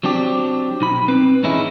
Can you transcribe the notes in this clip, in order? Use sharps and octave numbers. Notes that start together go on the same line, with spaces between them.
F#3 C4 D4 G4
B1 D#4 B5
C4 B4
E2 A2 C#4 D#4 E4 G#4